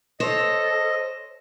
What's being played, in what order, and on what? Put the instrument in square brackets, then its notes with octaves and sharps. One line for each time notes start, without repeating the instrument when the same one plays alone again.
[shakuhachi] A4 [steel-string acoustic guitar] C5 C#5 [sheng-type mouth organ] D#5